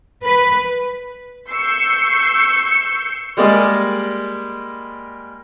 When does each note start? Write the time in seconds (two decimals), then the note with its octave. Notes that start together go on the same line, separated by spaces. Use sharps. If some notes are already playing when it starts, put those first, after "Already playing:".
0.24 B4
1.49 C#6 E6 G6 C7 C#7
3.37 G3 G#3 A#3 D5 D#5